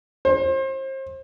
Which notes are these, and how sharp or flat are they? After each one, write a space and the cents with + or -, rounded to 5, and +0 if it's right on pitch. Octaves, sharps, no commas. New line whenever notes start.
C5 +35